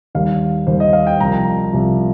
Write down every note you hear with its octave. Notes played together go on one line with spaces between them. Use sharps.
D#2 D#3 G3 F5
D#2 D#3 G3 C5
D#5
F5
G5
C2 C3 F3 A#5
C2 C3 F3